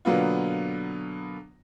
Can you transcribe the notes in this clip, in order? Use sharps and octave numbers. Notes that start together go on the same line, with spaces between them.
B2 D3 F#3 A#3 B3 F4